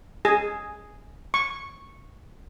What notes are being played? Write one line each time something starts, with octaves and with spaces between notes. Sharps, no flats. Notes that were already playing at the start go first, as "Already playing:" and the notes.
G#4
C#6